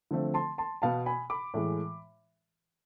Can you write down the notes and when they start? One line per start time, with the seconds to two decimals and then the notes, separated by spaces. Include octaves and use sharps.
0.11 D3 F3 A3 C4
0.34 A5 C6
0.58 A5 C6
0.82 B2 B3 F5 A5
1.06 G#5 B5
1.30 B5 D6
1.54 A2 E3 G#3